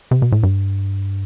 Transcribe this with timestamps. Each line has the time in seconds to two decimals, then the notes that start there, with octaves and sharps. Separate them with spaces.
0.11 C3
0.22 B2
0.32 A2
0.43 G2